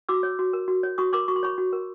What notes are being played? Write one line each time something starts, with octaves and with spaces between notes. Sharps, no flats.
F#4 D6 E6
C#5
F#4
A#4
F#4
C#5
F#4 C#6 D#6
A#4 C6 D6
F#4 C#6
C6
C#5 B5 C#6
F#4
A#4